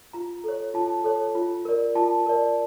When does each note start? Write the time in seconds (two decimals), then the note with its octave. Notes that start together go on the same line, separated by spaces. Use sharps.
0.13 F4 A#5
0.44 A4 C#5
0.74 F4 A5
1.04 A4 C#5
1.35 F4
1.65 A#4 D5
1.95 F4 A5
2.26 A#4 D5